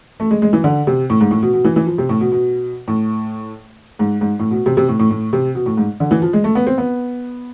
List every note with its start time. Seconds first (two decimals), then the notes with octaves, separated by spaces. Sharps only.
0.20 A3
0.31 G#3
0.42 G#3
0.53 E3
0.64 D3
0.87 C3
1.10 A2
1.21 G#2
1.31 A2
1.42 B2
1.53 B2
1.64 E3
1.76 E3
1.87 F3
1.98 C3
2.09 A2
2.21 B2
2.32 B2
2.88 A2
3.99 G#2
4.21 G#2
4.39 A2
4.51 B2
4.66 C3
4.77 C3
4.88 A2
4.99 A2
5.10 A2
5.33 C3
5.55 B2
5.66 A2
5.77 G#2
6.00 D3
6.11 E3
6.22 F3
6.33 G#3
6.44 A3
6.55 B3
6.67 C4
6.78 B3